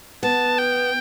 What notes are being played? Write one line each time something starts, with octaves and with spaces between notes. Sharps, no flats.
B3 A5
G5